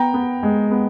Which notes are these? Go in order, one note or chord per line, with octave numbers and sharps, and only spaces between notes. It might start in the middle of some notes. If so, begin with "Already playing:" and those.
Already playing: B3 G5 A#5
B3
G#3
B3